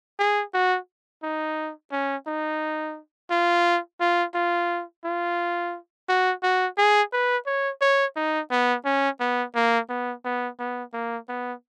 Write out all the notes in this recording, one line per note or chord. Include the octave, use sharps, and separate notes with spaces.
G#4
F#4
D#4
C#4
D#4
F4
F4
F4
F4
F#4
F#4
G#4
B4
C#5
C#5
D#4
B3
C#4
B3
A#3
B3
B3
B3
A#3
B3